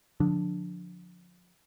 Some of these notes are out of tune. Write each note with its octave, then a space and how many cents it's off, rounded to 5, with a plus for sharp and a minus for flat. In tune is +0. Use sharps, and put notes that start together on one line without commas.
D3 +0 F3 +35 D4 +0